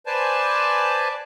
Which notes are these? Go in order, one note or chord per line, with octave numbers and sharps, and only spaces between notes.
B4 C5 D5 G#5 A5